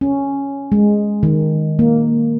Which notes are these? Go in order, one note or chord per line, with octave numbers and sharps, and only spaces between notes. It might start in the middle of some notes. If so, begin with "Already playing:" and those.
C#4
G#3
D#3
A#3